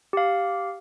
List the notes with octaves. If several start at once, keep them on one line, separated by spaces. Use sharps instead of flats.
G4 F5